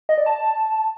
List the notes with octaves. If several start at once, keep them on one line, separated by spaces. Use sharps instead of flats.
D#5
D5
A5